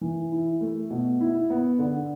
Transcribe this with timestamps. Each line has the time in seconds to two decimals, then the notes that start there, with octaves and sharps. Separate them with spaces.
0.01 E3
0.32 E4
0.61 A3
0.90 B2
1.21 E4
1.50 B3
1.79 D3